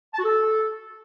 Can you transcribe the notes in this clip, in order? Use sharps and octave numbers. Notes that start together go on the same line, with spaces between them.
A5
F#4
A4